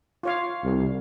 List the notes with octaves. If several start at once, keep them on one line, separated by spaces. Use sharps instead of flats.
F4 C#5 F5
C2